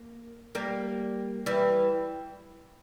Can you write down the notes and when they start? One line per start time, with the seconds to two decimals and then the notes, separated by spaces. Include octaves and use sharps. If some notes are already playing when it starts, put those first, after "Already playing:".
Already playing: A#3
0.55 G3 A#3
1.46 E3 G3